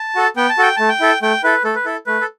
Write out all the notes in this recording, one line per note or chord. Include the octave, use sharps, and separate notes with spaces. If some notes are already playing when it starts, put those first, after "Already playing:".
Already playing: A5
F#4 A4
B3 G5
A5
F#4 A4 G5
A3 A5
G5
E4 A4
A3 G5
E4 A4 B4
A3 A4
B4
E4 A4
A3 B4
A4